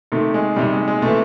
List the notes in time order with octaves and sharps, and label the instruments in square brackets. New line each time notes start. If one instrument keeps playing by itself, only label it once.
[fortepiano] C3 D#3 A3
G#3
C3 D#3 G3
G#3
G#3
C3 E3 A3